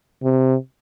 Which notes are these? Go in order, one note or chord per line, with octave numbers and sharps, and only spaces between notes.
C3